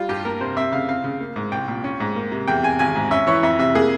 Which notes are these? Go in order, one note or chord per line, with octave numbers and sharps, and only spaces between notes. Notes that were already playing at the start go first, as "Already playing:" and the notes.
Already playing: G3 F4
G2 G4
A#3 A#4
C3 C5
C4 E5
C#3 F5
C4 F5
C#3
A#3
G#2
C2 G5
A#2
C#4
G#2
A#3
C3
E2 G5
C3 G#5
G#1 G#5
G#2
C#4 E5
E3 C#5
F2 E5
C3 E5
A#3 G#4